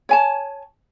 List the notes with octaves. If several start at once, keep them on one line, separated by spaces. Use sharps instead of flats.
C#5 G#5 A5